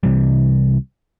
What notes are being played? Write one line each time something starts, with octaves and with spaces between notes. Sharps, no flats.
C2 C3 E3 G3